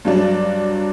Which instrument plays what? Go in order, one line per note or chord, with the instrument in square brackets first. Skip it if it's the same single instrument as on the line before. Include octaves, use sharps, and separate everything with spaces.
[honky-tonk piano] G2 F#3 D4